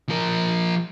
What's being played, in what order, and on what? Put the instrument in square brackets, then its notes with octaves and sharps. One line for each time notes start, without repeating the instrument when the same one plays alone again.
[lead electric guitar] F3 A#4